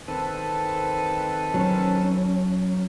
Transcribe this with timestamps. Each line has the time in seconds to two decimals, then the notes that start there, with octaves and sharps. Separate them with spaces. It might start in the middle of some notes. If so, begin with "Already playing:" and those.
0.08 D#3 C4 A4 B4 A5
1.54 F#3 C#4